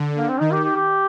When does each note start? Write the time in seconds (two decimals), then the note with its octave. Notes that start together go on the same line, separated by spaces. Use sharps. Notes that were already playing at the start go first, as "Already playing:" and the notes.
Already playing: D3
0.17 A#3
0.29 C4
0.40 D#3 D#4
0.52 G4
0.64 G4
0.76 G4